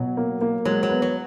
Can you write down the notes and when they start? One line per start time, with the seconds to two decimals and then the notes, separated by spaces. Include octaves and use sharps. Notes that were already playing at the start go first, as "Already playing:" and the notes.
Already playing: B2 F#3
0.17 A#3
0.41 A#3
0.65 F#3 G#3
0.83 F#3
0.89 B3
1.02 F#3